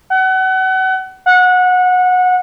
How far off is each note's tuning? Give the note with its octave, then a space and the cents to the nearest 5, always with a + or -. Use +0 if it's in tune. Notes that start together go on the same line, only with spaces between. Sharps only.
F#5 +30
F#5 -20